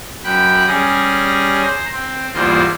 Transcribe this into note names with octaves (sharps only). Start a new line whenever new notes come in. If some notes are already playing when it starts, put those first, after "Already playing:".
F#2 G5 B5 F#6
G3 C#4 G#4 A#6
C5 A#5
C4
E2 G#2 G3 A#3 F4 C5